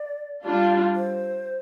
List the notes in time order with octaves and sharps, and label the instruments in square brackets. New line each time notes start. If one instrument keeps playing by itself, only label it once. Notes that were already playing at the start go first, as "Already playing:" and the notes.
Already playing: [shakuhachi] D5
[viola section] G3 D4 F4
[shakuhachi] C5